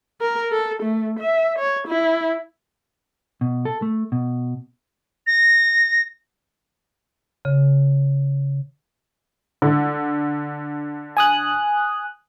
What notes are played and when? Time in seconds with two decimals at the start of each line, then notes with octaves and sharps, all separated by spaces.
0.21 A#4
0.52 A4
0.83 A3
1.19 E5
1.59 C#5
1.88 E4
3.41 B2
3.65 A4
3.82 A3
4.12 B2
5.27 A#6
7.45 C#3
9.62 D3
11.17 G#5 D#6 F#6